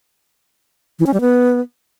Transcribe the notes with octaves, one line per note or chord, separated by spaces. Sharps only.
E3
C#4
G3
B3